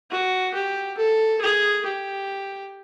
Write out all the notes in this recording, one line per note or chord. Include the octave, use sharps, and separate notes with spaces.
F#4
G4
A4
G#4
G4